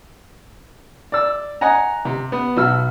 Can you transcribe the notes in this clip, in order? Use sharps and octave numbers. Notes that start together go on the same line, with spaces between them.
D5 E6
D#5 F#5 G#5 A#5
C3
B3
B1 B2 E6 F6